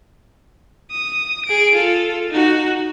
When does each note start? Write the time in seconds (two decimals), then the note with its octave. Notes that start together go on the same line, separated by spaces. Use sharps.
0.91 D#6
1.46 G#4 D7
1.75 F4 A4
2.30 D#4 F#4